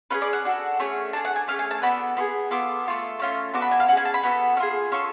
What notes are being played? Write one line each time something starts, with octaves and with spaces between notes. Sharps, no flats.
C#4 F4 G#4 B4
D5
F#5
D4 F#4 A4
A3 C#4 G#4
D4 G#4 A5
F#5
G#5
A3 C#4 G#4 F5
G#5
A5
B3 D4 F#4 A4 B5
B3 F4 G#4
B3 F4 A4 D6
A3 F4 A4
A3 C#4 F4
B3 D4 F#4 A4 D6
B5
G#5
F5
C#4 G#4 F#5
G#5
A5
B5
B3 F#4 A4
C#4
F4 G#4
C#4 F4 A4 C#6